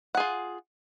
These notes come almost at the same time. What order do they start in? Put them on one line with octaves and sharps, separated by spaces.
F#5 G#4 F4